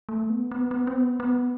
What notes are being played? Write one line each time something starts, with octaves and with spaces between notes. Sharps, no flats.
A3
B3
B3
B3
C4
B3
B3